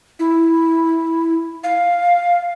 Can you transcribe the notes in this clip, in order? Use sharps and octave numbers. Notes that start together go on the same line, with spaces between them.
E4
F5